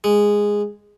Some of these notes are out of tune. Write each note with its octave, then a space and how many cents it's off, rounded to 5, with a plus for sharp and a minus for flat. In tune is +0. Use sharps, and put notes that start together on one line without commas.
G#3 -10